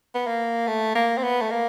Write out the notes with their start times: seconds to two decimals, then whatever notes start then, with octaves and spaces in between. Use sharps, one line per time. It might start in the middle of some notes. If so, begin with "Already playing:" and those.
0.15 B3
0.27 A#3
0.67 A3
0.95 A#3
1.18 C4
1.23 B3
1.41 A3
1.51 A#3